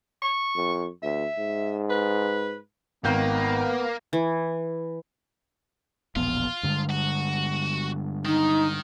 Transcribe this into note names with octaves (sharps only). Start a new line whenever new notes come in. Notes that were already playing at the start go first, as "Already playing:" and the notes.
C#6
F2
D2 E5
G#2
B4
G#1 D#3 A#3 B3 G6
E3
E1 A#1 B3 F4
G2 D3 G#3
F#4
D#3 D#4